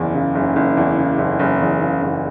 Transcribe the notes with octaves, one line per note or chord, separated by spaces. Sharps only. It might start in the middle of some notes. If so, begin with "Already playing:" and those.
Already playing: F#1 E2
C#3
F#1
F#1
E2
C#3
F#1
F#1
E2
C#3
F#1